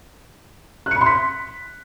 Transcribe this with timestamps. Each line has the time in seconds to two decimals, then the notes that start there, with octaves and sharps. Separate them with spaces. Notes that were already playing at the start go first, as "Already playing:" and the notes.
0.86 F#6
0.91 C#7
0.96 B5
1.01 C6
1.06 B6